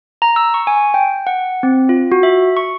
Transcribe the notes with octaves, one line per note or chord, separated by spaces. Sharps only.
A#5
E6
C#6
G#5
G5
F#5
C4
F4
F#4
E5
C#6